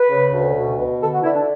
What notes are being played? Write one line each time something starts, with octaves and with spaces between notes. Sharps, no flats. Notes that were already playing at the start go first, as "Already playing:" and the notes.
Already playing: B4
C#3
D2
B2
B2
D3 A4
F#4
D3 E4
D4